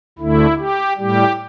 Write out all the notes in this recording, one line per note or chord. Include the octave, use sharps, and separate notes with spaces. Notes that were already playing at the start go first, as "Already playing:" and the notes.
D2 D3 A3 E4
G4
A2 G3 G4